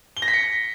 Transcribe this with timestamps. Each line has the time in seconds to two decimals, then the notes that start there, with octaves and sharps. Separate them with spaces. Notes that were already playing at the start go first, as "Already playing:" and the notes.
0.17 G7
0.22 A#6
0.28 B6
0.34 C#7